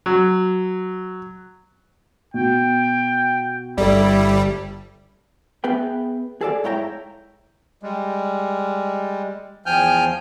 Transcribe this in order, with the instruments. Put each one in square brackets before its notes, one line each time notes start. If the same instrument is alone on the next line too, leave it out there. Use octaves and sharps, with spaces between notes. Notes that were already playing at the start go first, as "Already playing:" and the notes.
[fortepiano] F#3
[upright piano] B2 [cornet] G5
[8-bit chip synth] G1 G3 [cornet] E4 [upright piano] A4 D5
[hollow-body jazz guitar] B3 G#4 B4 E5 G5
G#4 A4 D5 F5
G#2 E4 C#5 E5 G5 A#5
[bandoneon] G3 G#3
E2 F3 G5 G#5 F6 G6